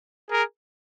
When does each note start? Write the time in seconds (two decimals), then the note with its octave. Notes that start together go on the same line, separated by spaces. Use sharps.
0.29 G#4 A#4